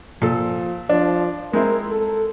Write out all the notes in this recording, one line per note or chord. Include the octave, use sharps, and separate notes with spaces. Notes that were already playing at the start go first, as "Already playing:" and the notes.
A#2 F3 A4
F3 D4
G#3 C4 E4 A#4
A4